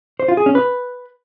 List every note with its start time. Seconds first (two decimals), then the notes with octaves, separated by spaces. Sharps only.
0.19 C5
0.28 F4
0.37 G#4
0.46 C#4
0.55 B4